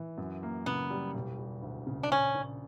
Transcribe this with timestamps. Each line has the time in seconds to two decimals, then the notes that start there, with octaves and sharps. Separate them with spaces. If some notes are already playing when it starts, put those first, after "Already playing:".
Already playing: E3
0.18 F#2
0.43 A#3
0.66 C#3 B3
0.90 G3
1.14 E1
1.38 G3
1.62 D2
1.87 C#3
2.03 D4
2.12 A#1 C#4
2.35 A#1